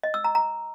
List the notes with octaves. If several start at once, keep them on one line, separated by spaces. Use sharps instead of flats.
D#5
E6
A#5
A#5